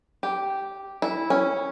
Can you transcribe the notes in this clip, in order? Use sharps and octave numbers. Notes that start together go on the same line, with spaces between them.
G4
E4
C#4